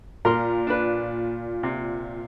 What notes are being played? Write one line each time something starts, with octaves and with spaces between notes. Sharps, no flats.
A#2 A#4 C6
D4 B4
C3